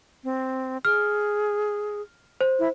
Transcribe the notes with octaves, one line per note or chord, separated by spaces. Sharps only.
C4
G#4 F6
C5
E4